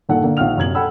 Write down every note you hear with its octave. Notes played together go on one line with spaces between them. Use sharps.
G2 A#2 D#3 A#3 A4 F#5
D3 A#3
A#1 D#3 F5 F#5 F6 F7
F#2 C3 G#6 F#7
A4 F#5 G5 B5 E6